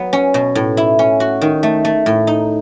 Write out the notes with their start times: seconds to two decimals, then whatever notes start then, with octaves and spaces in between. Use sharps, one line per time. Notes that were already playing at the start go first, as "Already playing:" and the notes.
Already playing: F#3 B3
0.13 C#4
0.34 B2
0.55 A2
0.77 E4
0.99 C#4
1.20 F#4
1.41 D#3
1.63 A3
1.85 A3
2.06 A2
2.27 D#4